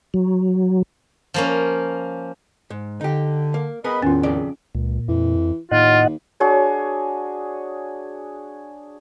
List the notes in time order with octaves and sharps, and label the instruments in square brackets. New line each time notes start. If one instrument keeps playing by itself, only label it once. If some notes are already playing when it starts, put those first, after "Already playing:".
[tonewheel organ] F#3
[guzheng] F3 A#3 C#4
[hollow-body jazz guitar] G#2
[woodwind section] D3 [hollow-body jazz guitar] D#4 G4
[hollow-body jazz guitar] A#3
[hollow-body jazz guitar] B3 G#4 A#4 [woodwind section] D#5 B5
[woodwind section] E2 A2 D#3 [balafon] C#4 F4
[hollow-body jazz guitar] F2 C#3 D5
[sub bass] C#2 [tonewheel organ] A#2
[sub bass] F2 [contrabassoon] E3
[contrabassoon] D#2 [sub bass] A2 [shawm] F4 [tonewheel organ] D#5 F#5
[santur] D4 F#4 G#4 C#5